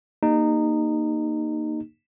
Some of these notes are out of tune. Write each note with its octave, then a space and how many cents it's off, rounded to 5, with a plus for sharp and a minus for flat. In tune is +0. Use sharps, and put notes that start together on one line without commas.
A#3 +0 D#4 -20 G4 +20